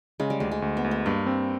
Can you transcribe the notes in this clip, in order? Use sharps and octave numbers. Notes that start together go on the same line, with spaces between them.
C#3 G#3
G3
D2 G#3
G#3
D2
B3
D2
B3
G2 A#3
C4